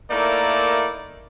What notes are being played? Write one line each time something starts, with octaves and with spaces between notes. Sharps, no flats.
A3 A#3 D#4 E4 A#4 D5